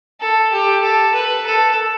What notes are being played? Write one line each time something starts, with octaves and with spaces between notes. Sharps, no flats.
A4
G4
A4
B4
A4